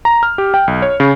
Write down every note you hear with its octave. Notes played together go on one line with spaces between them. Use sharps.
A#5
F6
G4
G5
B1
C#5
C#3